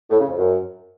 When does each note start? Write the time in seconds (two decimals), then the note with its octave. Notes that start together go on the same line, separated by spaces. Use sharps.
0.10 A2
0.20 C#3
0.29 F2
0.38 F#2